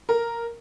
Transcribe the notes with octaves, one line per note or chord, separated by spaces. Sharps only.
A#4